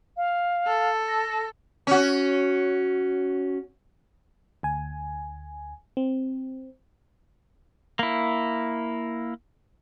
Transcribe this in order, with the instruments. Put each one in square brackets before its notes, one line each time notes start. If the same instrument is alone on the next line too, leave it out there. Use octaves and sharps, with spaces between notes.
[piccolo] F5
[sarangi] A4
[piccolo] A#6
[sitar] C#4 F#4
[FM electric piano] D2 G#5
C4
[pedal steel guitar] A#3 E4